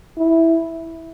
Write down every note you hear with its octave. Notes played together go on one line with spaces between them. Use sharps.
E4